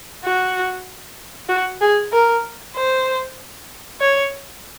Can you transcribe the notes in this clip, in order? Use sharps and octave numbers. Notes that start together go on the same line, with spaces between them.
F#4
F#4
G#4
A#4
C5
C#5